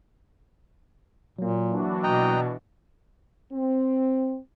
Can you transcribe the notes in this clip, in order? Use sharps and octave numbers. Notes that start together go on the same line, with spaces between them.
A#2 F#3 A#3
E3 D4 F#4
B2 D#5 G5 A#5
C4